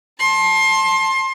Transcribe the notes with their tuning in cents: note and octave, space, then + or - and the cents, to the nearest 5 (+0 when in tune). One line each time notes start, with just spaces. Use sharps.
A5 +0 C6 +25